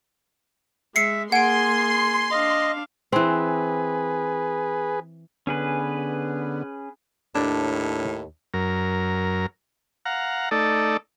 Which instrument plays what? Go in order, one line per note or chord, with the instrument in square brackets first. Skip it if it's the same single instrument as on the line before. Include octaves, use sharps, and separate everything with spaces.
[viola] G#3 [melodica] E5 [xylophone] C7 C#7
[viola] A#3 G#4 [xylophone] F#5 D7 [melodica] G#5 [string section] C6
[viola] D4 F5 [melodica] D#5
[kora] E3 C4 [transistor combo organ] G#4 B4
[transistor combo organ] D3 B3 [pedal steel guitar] C#4 G#4 B4
[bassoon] D#2 [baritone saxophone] A2 [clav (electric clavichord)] D4
[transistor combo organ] F#2 A#4
F5 F#5 A#5
A3 D#4 A4 D5